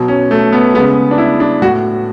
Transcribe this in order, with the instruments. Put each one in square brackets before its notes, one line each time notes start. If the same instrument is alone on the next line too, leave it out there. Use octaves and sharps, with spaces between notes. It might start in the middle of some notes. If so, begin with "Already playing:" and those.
Already playing: [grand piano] B2 F#3
C#4
A3
B3
G#3 B3
C#3
D4
E4
D4
A2 F#4